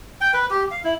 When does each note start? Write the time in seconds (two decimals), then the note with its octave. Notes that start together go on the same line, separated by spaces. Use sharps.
0.21 G5
0.34 B4
0.50 G4
0.71 F5
0.84 E4